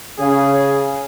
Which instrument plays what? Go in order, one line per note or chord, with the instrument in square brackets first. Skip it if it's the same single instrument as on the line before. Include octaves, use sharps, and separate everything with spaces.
[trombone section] C#3 [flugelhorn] G#4